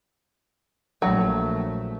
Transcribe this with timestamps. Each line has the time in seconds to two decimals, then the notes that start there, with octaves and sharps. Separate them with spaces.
1.02 A#1 F#3 A3